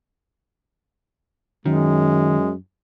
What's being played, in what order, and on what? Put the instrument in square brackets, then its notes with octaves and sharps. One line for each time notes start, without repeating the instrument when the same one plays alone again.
[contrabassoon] F#2 [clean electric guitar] D#3 [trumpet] G#3